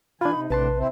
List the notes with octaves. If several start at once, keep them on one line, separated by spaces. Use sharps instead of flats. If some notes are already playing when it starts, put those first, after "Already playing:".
E3 D4 F4 G#5 B5
C3 D#4
A#1 A2 C3 D4 B4 A5 C6
C4 E4 C5